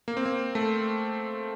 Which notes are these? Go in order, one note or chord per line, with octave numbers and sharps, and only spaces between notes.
A#3
C4
A#3
A3